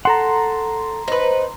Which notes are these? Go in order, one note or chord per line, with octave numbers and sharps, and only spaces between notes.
A4 F#5 A#5 C6
D#4 B4 C5